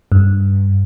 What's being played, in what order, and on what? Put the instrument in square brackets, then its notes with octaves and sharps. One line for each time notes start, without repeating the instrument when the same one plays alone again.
[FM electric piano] G2